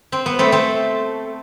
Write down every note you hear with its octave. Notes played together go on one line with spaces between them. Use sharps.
C4
B3
A3 C4
A3 C4